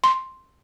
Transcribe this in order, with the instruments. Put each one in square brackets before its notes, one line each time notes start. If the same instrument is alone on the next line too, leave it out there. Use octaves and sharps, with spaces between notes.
[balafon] C6